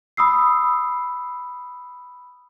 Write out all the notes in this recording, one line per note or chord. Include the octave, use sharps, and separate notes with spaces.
B5 D#6 E6 C7